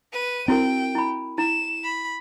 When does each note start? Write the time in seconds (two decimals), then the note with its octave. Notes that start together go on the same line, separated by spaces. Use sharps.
0.12 B4 D#7
0.48 C4 E4 F#4 A#4 G5
0.95 E4 B5
1.38 E4 E7
1.84 B5